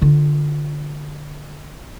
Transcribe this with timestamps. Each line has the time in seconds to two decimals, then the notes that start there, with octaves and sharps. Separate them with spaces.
0.02 D3 F4